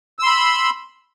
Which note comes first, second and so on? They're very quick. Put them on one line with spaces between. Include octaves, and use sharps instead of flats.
E6 C6 B5